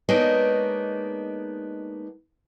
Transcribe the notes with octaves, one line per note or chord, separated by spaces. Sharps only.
G#3 A#3 B3 D4 D#4 C#5